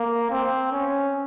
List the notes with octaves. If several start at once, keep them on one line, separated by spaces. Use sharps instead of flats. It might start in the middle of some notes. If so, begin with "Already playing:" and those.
Already playing: A#3
C4
C#4